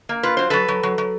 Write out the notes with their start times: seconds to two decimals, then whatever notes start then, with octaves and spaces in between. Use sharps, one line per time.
0.09 A#3
0.23 F4 B4
0.37 F#3 C5
0.50 F#3 A4 B4
0.68 F#3
0.83 F#3
0.98 F#3